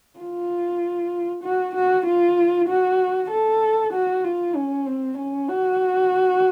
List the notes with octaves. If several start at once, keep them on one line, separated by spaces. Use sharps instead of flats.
F4
F#4
F#4
F4
F#4
A4
F#4
F4
C#4
C4
C#4
F#4